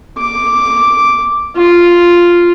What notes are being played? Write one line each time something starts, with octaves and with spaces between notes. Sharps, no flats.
D6
F4